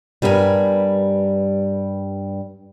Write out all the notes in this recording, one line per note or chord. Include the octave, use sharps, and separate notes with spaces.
G2 G3 B3 E4 A#4 G#5